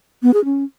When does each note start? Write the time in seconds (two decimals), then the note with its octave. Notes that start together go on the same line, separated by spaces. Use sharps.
0.23 B3
0.34 G#4
0.45 C#4